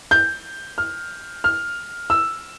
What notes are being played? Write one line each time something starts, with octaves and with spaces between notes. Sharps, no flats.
G6
F6
F6
E6